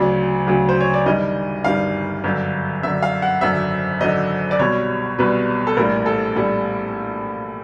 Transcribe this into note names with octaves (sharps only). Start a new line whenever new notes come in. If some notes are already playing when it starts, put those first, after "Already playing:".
Already playing: D2 C#3 F#3 D5
D2 C#3 F#3
C5
C#5
D5
G1 G2 D#3 G3 D#5
G1 G2 D#3 G3 F5
G1 F#2 D3
G1 F#2 D3 E5
F5
F#5
G#1 F#2 D3 E5
G#1 F#2 D3 D#5
D5
C2 B2 G3 C#5
C2 B2 G3 B4
A4
A#1 A2 E3 G3 A#4
A4
A#1 A2 E3 G3 E4